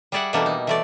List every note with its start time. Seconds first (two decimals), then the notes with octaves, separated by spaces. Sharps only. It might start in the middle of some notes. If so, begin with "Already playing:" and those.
0.12 G3 G#4 D5 E5 F#5
0.33 B2 E3 G3 A#3 D4 A4
0.46 D#4
0.67 E3 A3 D5